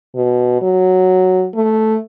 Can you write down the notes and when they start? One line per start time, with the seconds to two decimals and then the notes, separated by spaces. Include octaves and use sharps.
0.15 B2
0.62 F#3
1.55 A3